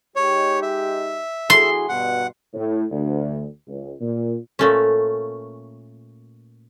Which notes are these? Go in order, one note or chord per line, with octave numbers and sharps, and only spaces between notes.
G#3 D#4 G4 C#5
E5
E4 F#4 G#4 C6
G2 B2 F#5
A2
D2
C#2
A#2
A#2 A3 C#4